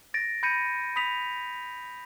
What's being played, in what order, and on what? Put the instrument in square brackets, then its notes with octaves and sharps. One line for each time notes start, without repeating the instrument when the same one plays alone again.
[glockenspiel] A6 A#6 D7
B5 G6 A#6 C#7 D#7
B5 D#6 B6 F7